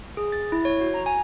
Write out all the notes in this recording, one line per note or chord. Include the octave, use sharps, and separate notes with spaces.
G#4
A6
E4
C#5
F#4
A#5
G#5